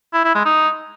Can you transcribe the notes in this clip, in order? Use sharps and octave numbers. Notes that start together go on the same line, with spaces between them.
E4
E4
G#3
D#4